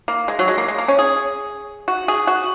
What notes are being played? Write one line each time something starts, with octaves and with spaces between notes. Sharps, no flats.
A#3
G#3
F#3
G#3
A#3
G#3
A#3
C#4
G#4
F#4
G#4
F#4